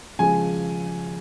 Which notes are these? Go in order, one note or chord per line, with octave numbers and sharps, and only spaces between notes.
C#3 F3 G#3 G#5